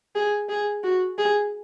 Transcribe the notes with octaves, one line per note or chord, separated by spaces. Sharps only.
G#4
G#4
F#4
G#4